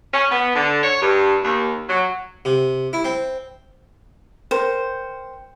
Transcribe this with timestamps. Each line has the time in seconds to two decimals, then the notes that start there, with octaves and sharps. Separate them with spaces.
0.13 C#4
0.31 B3
0.55 D3
0.83 C#5
1.01 G2
1.43 D#2
1.89 F#3
2.45 C3
2.93 E4
3.04 C4
4.51 A#4 C5 G5